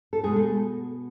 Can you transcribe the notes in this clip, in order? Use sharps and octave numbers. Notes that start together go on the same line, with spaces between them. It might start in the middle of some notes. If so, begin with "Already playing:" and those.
A4
B2 G#3 A3 G#4
A3 A4